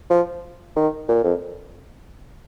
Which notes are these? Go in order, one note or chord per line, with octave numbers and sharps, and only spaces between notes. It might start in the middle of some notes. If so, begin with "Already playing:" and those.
F3
D#3
A#2
F2